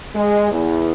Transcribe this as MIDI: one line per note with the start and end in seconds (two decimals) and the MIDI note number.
0.15 0.51 56
0.51 0.92 40